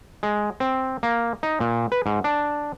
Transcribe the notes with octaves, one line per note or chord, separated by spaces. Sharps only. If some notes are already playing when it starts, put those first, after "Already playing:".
G#3
C4
A#3
D#4
A#2
B4
G#2
D4